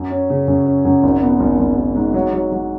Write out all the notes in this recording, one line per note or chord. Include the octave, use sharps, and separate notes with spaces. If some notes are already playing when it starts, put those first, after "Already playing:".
Already playing: F#2
C#4
C#3
F#2
C#4
F#2
G#1
B3
G#1
G#1
G#1
G#2
F#3
F#3
F#3